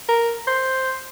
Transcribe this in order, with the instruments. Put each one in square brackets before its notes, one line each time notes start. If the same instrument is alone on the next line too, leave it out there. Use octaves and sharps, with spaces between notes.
[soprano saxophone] A#4
C5